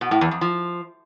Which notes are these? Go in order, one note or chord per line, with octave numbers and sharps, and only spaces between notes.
B2
A2
E2
F2
F3